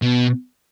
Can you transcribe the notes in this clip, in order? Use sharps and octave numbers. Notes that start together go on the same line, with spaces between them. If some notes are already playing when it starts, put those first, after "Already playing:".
B2